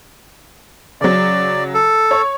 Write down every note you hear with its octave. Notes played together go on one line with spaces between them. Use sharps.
C#3 F#3 D5
A4
C#5 C#6